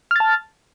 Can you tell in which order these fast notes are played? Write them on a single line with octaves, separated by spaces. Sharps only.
F6 A6 A5